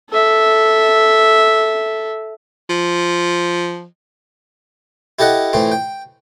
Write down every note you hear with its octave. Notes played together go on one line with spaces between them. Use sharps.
A4 E5
F3
E4 G4 A4 D#5 F#5
A2 E3 C4 F4
G5